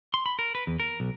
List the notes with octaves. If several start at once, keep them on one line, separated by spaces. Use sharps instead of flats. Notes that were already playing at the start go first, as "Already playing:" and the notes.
C6
B5
A#4
B4
E2
A#4
B1